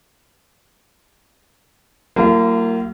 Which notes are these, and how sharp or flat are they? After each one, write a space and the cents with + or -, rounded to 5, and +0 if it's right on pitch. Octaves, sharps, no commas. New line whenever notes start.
F#3 +30 A#3 -25 F4 -45